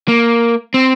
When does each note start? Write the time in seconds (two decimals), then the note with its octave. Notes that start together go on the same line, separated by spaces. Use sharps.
0.08 A#3
0.74 C4